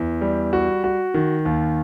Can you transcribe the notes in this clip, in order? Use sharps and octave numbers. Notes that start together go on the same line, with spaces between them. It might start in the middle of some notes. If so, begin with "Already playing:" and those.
Already playing: E2
G3
F#4
F#4
D#3
D#2